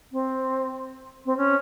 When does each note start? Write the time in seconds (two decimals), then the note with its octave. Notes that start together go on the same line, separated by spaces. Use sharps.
0.12 C4
1.26 C4
1.37 C#4